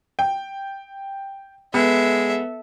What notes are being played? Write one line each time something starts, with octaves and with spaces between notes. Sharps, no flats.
G5
G#3 B3 A4 E5